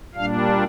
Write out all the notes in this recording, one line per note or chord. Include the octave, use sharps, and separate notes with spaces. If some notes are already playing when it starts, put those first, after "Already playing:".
A#2 G3 D4 F5